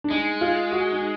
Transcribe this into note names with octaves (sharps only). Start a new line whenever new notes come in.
D4
G#3 D#4
F4
F#4
D#4